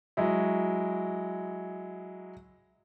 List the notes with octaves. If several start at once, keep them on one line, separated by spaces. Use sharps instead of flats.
F#3 G#3 E4